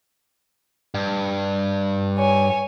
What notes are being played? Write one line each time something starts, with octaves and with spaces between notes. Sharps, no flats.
G2
C#5 G#5